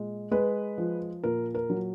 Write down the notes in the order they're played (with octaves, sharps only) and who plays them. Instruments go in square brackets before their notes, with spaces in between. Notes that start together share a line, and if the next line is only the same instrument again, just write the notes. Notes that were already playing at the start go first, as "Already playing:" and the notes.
Already playing: [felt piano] A#2 G#3
G#3 B4
F3
A#2 A#4
A#4
F#3